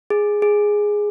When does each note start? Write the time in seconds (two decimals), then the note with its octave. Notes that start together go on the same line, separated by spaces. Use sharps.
0.10 G#4
0.42 G#4